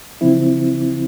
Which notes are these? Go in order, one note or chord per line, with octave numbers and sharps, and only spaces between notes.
C#3 F3 C4 E4